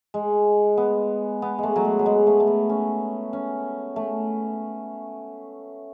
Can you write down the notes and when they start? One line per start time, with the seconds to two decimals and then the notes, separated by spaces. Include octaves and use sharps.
0.14 G#3
0.77 B3
1.42 B3
1.58 G#3 A3
1.76 F#3
1.85 G#3
1.99 F#3
2.06 G#3
2.27 A3
2.40 A3
2.47 B3
2.69 C#4
3.33 C#4
3.96 A3